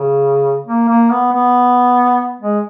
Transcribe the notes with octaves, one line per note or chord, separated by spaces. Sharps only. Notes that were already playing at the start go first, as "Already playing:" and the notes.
Already playing: C#3
A#3
A#3
B3
B3
G#3